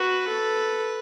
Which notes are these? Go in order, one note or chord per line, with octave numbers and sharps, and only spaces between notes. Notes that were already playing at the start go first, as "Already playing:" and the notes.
Already playing: F#4 B4
A4